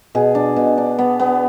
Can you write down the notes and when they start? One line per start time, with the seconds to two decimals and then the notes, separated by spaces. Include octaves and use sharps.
0.15 B2 G#4
0.35 D4
0.56 B2
0.77 D4
0.99 B3
1.19 B3